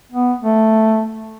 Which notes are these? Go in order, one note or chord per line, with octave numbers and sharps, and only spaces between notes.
B3
A3